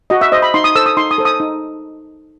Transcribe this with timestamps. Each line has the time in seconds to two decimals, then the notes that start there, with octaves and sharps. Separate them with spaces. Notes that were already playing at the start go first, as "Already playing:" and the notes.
0.10 F#4 D#5
0.21 E5
0.32 C5 D#5
0.42 B5
0.54 D#4 C6
0.64 D#6
0.76 A4 C5 E6
0.86 D#6
0.97 D#4 C6
1.11 D#6
1.18 A4 C5
1.25 D#6
1.40 D#4